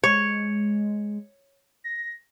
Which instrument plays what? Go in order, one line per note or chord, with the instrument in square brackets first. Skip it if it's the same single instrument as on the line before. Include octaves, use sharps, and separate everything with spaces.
[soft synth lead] G#3 [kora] C#5
[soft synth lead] A#6